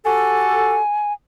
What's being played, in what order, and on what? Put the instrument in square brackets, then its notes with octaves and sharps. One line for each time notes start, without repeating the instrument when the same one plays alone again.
[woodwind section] F#4 G4 A4 [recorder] G#5